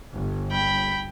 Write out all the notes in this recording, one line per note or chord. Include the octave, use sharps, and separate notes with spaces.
G1
G5 B5